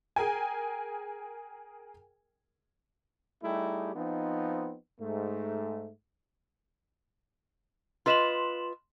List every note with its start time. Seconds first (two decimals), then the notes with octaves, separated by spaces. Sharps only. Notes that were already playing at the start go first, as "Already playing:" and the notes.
0.16 G#4 A#4 G5 G#5
3.43 G3 A3 D#4 E4 G4 G#4
3.95 F3 B3 C4 D#4
4.99 G#2 A3
8.06 F4 B4 D#5 C6 E7 F#7